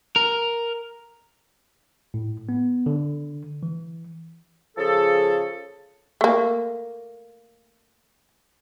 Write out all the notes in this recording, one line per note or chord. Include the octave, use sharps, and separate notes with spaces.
A#4
A2
B3
D3
E3
C#3 F3 G#4 A4
A3 A#3